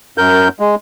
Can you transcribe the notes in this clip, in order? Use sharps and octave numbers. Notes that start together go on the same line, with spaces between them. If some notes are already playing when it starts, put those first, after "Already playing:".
F#2 A#4 G6
G#3